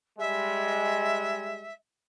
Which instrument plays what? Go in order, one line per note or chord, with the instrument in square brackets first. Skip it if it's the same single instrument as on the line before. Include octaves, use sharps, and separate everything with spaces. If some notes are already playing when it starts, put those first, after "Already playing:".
[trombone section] G3 G#3 [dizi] E5